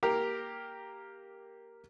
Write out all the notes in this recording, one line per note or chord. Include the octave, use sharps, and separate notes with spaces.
A#3 G4 A#4